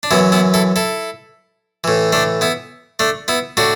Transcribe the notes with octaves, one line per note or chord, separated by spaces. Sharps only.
D4
F#2 E3 B3 E4
B3 E4
E4 A4
E4 A4
A2 E3
A3 D4
B3 E4
A3 D4
B3 E4
A2 D4 F#4